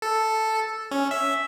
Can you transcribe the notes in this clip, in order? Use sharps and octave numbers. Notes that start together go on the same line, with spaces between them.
A4
C#4
E5